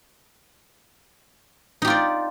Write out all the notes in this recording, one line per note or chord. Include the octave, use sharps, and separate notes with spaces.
D#4 F4 G4 D5